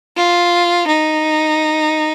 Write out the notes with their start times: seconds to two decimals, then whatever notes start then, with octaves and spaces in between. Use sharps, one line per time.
0.16 F4
0.87 D#4